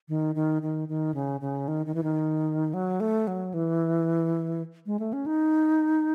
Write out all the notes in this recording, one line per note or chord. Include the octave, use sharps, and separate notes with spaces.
D#3
D#3
D#3
D#3
C#3
C#3
D#3
D#3
E3
D#3
F#3
A3
F#3
E3
G#3
A3
C#4
D#4